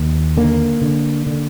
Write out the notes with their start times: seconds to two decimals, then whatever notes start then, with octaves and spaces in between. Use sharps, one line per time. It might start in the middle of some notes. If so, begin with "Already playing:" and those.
Already playing: D#2
0.37 D3 A#3
0.82 D3
1.27 D3